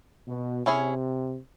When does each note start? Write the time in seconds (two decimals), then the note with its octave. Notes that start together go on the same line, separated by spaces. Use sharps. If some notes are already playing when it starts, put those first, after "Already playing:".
0.27 B2
0.66 C3 C#4 E4 G#4 C#5